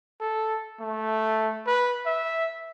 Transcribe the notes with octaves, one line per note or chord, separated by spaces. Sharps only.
A4
A3
B4
E5